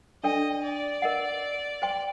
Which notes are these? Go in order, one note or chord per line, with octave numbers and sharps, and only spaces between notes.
D4 A4 D5 D#5 G5
D5
A#4 D#5 F#5
C5 G5 C6